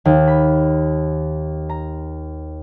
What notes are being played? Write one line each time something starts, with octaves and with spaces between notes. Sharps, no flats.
D#2
B5
A#5